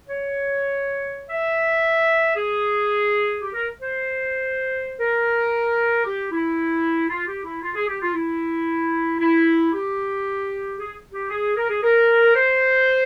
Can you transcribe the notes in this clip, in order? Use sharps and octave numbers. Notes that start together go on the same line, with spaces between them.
C#5
E5
G#4
G4
A#4
C5
A#4
G4
E4
F4
G4
E4
F4
G#4
G4
F4
E4
E4
G4
G#4
G4
G#4
A#4
G#4
A#4
C5